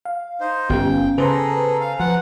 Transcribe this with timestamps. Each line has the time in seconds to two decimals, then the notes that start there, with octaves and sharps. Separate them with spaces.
0.05 F5
0.40 D#4 C5
0.69 G1 B3 C#4 G5
1.18 C#3 G#4 A4 B4 C5 G#5 A#5
1.81 F5
2.00 F3 F#5